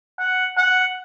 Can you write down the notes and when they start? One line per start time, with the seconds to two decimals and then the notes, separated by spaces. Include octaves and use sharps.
0.19 F#5
0.57 F#5